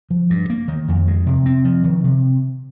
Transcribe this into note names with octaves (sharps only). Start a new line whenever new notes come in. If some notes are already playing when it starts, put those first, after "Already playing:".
F3
G2
A#3
D#3
F2
G#3
C3
C4
F3
D#3
C3